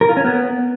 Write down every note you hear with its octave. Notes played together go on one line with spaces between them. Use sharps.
A#4
F4
C#4
B3